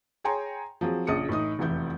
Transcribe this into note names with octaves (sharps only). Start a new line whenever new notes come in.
G#4 C#5 G5 G#5 A#5 C6
F3 F#3 C4 G#4
A#1 C#3 D#6 C#7
A2 E3 D#4 D#6
F1 E2 E3 E4 G6